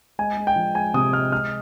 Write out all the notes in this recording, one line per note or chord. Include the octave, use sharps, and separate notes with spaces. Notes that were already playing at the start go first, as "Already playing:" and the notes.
G#3 G#5
G#3
G5
F3
G#3 G#5
C3 D#6
G#3 F6
G#3 F6